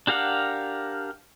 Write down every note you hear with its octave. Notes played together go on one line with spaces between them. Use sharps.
D4 G4 A#4 F5 F#5